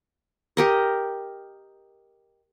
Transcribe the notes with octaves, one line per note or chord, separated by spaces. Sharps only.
G4 A#4 D#5